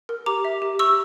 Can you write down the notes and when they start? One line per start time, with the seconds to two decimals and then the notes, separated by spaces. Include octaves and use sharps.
0.09 A#4
0.26 G4 A#5 D6
0.45 E5
0.62 G4
0.79 G4 C#6 E6